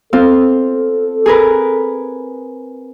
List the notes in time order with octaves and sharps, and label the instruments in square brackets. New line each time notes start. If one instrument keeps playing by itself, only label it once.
[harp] C4 F4 [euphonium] A4
[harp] G#4 A#4 B4